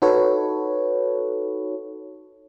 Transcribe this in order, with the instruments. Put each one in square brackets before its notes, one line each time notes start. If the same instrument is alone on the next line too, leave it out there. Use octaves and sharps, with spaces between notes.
[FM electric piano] D#4 F#4 A4 B4 C#5